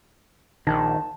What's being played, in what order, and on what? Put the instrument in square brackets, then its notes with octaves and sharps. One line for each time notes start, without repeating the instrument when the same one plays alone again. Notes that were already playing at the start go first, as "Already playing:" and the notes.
[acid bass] A#1 [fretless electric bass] D#3 [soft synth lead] A5